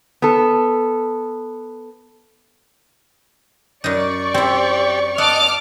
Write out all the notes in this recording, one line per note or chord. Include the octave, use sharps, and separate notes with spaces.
B3 A4
F#2 D#4 D5 C#6
C4 E4 G4
D#5 F#5 A5 D6 F6